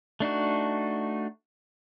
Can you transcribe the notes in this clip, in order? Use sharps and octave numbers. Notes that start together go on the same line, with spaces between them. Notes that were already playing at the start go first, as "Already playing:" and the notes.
A3 D4 D#4 F#4